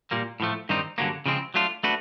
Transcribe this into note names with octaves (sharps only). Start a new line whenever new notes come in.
A#2 G3 A#3
A2 F3 A3
G2 D#3 G3 C4 D#4
G2 D3 F#3 A#3 C#4
C#3 F3 G#3 C4
F#3 A3 D4 F4
A3 D4 F#4 B4